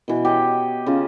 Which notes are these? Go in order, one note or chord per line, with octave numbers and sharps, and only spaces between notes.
B2 E3
G4 C#5 D#5
C#3 F4